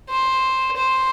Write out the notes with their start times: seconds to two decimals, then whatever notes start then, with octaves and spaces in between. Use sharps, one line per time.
0.09 C5
0.77 C5